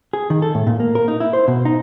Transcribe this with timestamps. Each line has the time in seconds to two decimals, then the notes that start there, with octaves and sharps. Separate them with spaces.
0.13 G#4
0.30 D#3
0.42 A4
0.55 A2
0.67 A#2
0.80 A#3
0.95 A#4
1.08 D#4
1.20 E4
1.33 C5
1.48 B2
1.65 D#4